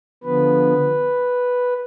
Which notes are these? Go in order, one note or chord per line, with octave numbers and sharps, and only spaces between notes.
D3 F3 B3 B4